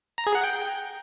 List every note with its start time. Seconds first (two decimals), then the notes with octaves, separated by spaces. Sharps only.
0.18 A#5
0.27 G#4
0.35 F#5
0.44 G5